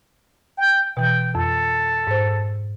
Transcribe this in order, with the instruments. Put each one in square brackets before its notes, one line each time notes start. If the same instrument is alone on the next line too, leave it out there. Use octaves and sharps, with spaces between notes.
[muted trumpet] G5
[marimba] B2 E3 [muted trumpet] G5
[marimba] F2 [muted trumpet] A4
[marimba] G#2 C5